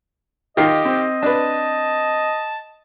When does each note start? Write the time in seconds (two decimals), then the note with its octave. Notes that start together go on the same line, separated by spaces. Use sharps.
0.57 D#3 F4 G4 D#5 G5 C7
0.85 C4
1.23 D4 B4 A5